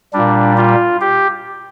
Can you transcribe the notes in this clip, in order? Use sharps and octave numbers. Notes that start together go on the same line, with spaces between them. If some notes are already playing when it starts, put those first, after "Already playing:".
A#2 G3 D4
F4
G4